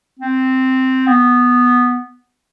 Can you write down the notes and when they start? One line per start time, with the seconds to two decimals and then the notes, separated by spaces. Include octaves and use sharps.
0.19 C4
1.07 B3